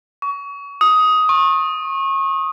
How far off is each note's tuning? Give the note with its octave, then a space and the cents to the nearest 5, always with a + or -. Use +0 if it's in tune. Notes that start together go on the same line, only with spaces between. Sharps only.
C#6 +30
D#6 +10
C#6 -30